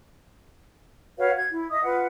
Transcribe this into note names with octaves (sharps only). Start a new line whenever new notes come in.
F#4 B4 C#5 F5
G#6
E4
D#5 E5 D#6
F4 B4 F#5